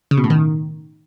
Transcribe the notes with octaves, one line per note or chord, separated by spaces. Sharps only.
C#3
B2
A2
D#3